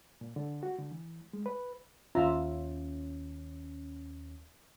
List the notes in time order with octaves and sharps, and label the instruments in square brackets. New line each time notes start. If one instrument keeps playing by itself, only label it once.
[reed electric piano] A#2
D3
F#4
D3
E3
G#3
B4
[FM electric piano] D#2 C#4 [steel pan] F4 E5 A#5